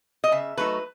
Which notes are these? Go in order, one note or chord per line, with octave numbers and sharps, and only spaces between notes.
D#5
C#3 E5
F#3 A3 D#4 B4